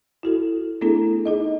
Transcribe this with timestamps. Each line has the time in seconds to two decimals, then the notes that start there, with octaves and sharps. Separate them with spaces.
0.23 E4 F#4 A4
0.81 A3 B3 D4 E4 G#4 A4
1.25 D#4 G#4 D#5